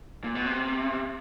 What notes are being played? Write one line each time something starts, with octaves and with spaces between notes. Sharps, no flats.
A#2
B2
C3